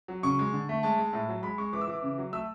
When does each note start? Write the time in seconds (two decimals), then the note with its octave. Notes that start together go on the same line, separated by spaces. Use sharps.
0.08 F#3
0.23 C#3 C#6
0.39 G#3
0.53 D3
0.69 A3
0.83 G#3 A5
0.98 G#3
1.13 A2
1.29 F#3
1.43 G#3 B5
1.58 G#3 C#6
1.73 E3 D6
1.81 E6
1.88 E3 D6
2.02 C#3
2.18 F#3
2.33 A3 E6